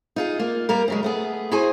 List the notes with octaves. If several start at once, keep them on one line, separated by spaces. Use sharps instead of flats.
D#4 F4 G#4
A#3 F4
G3 A#3 A#4
C#3 F#3 G#3
A3 B3 G#4
E4 F#4 G#4 C5 G#5